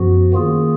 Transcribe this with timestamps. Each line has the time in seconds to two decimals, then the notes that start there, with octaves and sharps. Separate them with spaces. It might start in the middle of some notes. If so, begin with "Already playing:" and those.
Already playing: F#2 F3 B3 F#4
0.33 D#3 A#3 F4 G#4